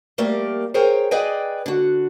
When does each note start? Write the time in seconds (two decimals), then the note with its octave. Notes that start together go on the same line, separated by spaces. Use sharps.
0.18 G3 A3 A#3 G4 A#4 D5
0.74 G#4 A#4 C5 C#5 G5 A#5
1.11 G#4 B4 D5 D#5 G5 G#5
1.66 D3 F#4